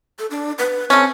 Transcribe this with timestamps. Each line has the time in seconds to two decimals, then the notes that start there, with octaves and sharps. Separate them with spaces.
0.19 A4
0.31 D4
0.59 B4
0.90 A3 C4 C#4